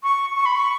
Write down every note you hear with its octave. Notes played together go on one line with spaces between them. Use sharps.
C#6
C#6
B5
C#6